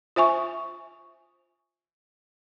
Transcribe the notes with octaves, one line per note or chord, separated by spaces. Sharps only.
F4 C5 E5 G#5 C#6